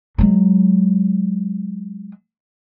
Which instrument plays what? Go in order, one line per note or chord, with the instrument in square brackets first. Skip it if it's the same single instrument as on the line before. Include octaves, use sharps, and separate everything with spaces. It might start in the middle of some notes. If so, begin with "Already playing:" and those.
[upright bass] F#3 G#3